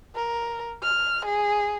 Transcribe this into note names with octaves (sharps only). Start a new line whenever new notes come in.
A#4
F6
G#4